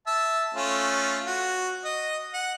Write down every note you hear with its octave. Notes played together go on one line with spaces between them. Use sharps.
E5 A5
A3 C#4 F4
F#4
D#5
F#5